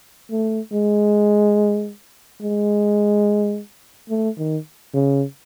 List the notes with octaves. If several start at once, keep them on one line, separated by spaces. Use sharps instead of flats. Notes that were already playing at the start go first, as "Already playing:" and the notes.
A3
G#3
G#3
A3
D#3
C#3